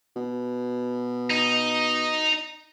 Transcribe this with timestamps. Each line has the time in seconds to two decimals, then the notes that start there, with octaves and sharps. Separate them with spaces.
0.16 B2
1.30 D#4